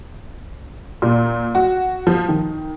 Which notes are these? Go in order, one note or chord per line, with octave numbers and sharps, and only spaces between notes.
A#2
F#4
F3
D#3